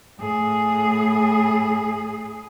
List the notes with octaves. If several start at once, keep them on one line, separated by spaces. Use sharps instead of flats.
A2 G#4